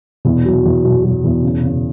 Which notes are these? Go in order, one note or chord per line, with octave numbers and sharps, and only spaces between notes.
E2 B2
F#3
E2
B2 F#3
F#3
E2
C#3
C#3